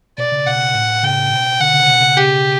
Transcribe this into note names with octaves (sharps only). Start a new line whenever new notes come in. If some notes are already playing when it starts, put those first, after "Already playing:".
B2 D5
C#3
B2 F#5
A2
C#3 G5
B2
D3 F#5
C#3
B2
C#3
C#3 G4